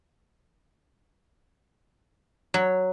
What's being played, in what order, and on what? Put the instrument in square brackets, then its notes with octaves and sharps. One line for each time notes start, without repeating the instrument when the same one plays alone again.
[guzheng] F#3